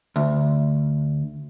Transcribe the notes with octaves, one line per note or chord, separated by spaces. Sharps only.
D2